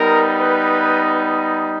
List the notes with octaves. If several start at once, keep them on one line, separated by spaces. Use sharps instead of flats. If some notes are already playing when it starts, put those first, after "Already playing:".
Already playing: G3 B3 D#4 A#4
B4